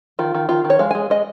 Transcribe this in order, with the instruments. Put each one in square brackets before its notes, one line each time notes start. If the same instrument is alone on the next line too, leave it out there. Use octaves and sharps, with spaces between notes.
[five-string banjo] D#3 F4
D#3
D#3 F4
D#3
C#5
G#3 F5
G#3 G#5
G#3 D#5